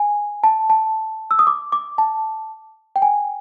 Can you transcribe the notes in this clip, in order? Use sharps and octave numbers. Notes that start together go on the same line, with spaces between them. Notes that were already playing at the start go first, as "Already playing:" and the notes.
Already playing: G#5
A5
A5
E6
D#6
D6
D6
A5
G5
G#5